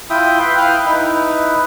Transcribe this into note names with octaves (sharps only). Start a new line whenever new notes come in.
E4 F4 E5 G5 D#6
B4 E5 F#5 G5 C6
E4 F5 G5 D#6 F#6
D#4 E4 B4